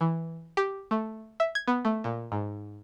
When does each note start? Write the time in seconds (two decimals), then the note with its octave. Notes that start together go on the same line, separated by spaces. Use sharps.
0.01 E3
0.57 G4
0.91 A3
1.40 E5
1.55 G#6
1.68 B3
1.85 A3
2.04 A#2
2.32 G#2